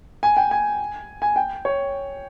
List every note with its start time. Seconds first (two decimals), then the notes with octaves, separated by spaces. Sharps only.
0.23 G#5
0.37 G5
0.51 G#5
1.22 G#5
1.36 G5
1.65 C#5